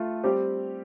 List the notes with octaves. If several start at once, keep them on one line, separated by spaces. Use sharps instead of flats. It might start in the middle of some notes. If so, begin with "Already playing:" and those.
Already playing: A3 F4 A4
G3 C4 G4